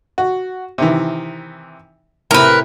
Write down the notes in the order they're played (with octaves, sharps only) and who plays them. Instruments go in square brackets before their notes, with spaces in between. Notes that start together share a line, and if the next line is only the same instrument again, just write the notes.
[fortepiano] F#4
C3 D#3 E3
[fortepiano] A2 C3 [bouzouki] A#4 B4